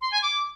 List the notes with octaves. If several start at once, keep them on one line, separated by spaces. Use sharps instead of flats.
C6
G#5
D6